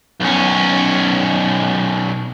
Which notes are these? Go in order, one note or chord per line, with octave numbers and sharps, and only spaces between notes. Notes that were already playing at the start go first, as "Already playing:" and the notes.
B1 C#4